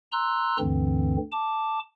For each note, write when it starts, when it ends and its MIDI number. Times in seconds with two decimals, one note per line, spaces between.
0.12 0.57 82
0.12 0.57 84
0.12 0.57 88
0.12 0.57 90
0.59 1.17 38
0.59 1.17 43
0.59 1.17 50
0.59 1.17 52
0.59 1.17 60
1.32 1.80 81
1.32 1.80 86